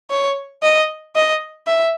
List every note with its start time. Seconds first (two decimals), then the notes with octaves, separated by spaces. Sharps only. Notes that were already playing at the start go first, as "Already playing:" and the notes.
0.10 C#5
0.62 D#5
1.16 D#5
1.67 E5